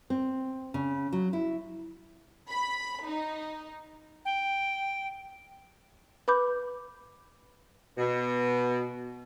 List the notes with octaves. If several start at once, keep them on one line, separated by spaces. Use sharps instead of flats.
C4
C#3
F#3
E4
B5
D#4
G5
B4 B5 D6 G6
B2